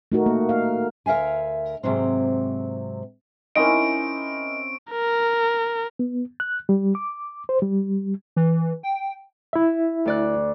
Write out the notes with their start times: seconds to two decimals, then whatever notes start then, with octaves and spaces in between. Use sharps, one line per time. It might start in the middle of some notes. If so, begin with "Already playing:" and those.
0.12 A3 D#4 F#4 A#4
0.26 A#3
0.49 F5
1.06 D2 A#4 E5 F5 G#5
1.83 G#2 C3 F#3 C4
3.55 C4 C#4 D#4 E4 A#4 D7
4.91 A#4
5.99 B3
6.40 F#6
6.69 G3
6.95 D6
7.49 C5
7.62 G3
8.36 E3
8.83 G5
9.53 E4 E5
10.05 D2 D5 F#6